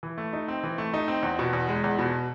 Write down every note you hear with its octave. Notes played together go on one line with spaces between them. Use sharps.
E3
A3
D#4
C4
E3
A3
D#4
C4
E2
B2
E2
G#3
E2
B2